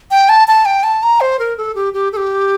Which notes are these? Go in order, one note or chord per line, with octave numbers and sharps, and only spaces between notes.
G5
A5
A5
G5
A5
A#5
C5
A#4
A4
G4
G4
A4
G4